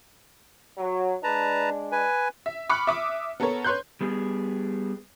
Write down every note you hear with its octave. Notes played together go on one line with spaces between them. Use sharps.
F#3
G#3 D4 B4 A5 A#5
B4 G#5
E5
B5 C#6 D6 F6 F#6 C#7
E5 D6 D#6
B3 A4 A#4 C#5
B4 C#5 C6 F#6 G6
G3 B3 G#4